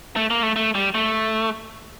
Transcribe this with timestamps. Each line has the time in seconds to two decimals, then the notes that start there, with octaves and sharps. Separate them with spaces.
0.16 A3
0.30 A#3
0.43 A3
0.56 A3
0.75 G3
0.95 A3